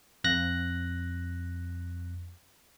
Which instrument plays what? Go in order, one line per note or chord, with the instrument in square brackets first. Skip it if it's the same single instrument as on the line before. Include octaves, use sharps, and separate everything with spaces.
[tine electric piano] F2 F#6 A#6